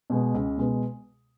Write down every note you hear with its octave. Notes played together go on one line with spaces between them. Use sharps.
B2 G#3 B3
C#2
B2 G#3 B3